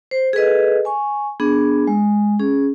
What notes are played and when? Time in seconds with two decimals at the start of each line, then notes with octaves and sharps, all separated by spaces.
0.11 C5
0.33 G#4 A4 B4 D#5
0.85 G#5 C#6
1.40 B3 D4 G#4
1.87 G#3
2.39 C#4 G#4